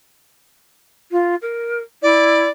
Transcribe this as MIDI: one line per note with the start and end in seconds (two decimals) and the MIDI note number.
1.11 1.35 65
1.42 1.78 70
2.02 2.42 64
2.02 2.49 74